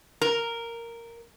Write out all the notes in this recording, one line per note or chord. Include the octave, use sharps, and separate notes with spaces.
A#4